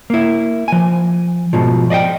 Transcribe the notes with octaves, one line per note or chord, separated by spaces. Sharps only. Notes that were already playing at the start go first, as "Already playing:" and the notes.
A#3 E4
F3 G#5
G#2 B2 F3
D5 D#5 F5 G5